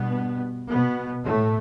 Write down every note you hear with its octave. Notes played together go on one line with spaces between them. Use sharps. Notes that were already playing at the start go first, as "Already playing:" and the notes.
Already playing: G2 B2 B3
B2 B3
A2 A3